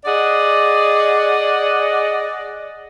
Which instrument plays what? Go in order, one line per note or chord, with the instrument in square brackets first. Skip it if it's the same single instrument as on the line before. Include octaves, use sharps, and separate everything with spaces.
[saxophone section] G#4 D5 D#5 F#5